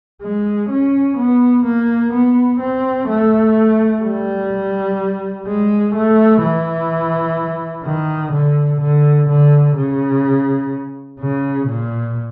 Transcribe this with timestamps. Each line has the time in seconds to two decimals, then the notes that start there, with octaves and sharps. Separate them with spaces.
0.23 G#3
0.70 C#4
1.17 B3
1.65 A#3
2.13 B3
2.60 C4
3.09 A3
4.03 G3
5.47 G#3
5.95 A3
6.43 E3
7.85 D#3
8.32 D3
8.81 D3
9.29 D3
9.76 C#3
11.20 C#3
11.67 A#2